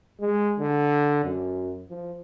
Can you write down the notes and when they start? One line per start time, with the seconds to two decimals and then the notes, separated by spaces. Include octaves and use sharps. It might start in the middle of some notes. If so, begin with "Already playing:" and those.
0.20 G#3
0.60 D3
1.25 F#2
1.89 F3